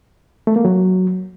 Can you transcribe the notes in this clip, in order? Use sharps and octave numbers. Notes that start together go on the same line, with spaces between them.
A3
A#3
F#3